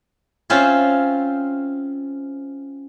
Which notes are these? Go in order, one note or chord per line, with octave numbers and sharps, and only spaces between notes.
C4 C#4 F4 C5 E5